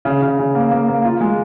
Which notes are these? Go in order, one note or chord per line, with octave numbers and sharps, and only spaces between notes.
C#3
C#3
C#3
A#3
A#3
A#3
F4
G#3